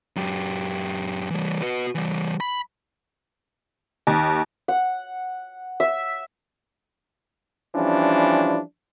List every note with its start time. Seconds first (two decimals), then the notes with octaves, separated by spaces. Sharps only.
0.16 F#2 G4
1.31 E3 G3
1.62 F#4 B4
1.95 E3 G3
2.40 B5
4.07 D#2
4.68 F#5
5.80 E5
7.75 E3 F3 G3 C#4 D4